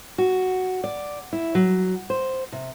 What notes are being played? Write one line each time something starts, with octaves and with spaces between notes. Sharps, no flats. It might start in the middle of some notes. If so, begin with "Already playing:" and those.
F#4
D5
E4
F#3
C5
C3